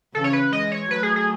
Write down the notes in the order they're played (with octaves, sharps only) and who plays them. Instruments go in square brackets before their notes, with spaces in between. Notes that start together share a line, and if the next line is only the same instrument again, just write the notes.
[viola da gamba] C#3 E3 [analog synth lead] A4
[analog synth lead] C#5
B4
[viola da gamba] E3 G#3 [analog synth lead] D#5
[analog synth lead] C#5
[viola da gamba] F#3 A3 [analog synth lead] B4
[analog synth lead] G#4
G#4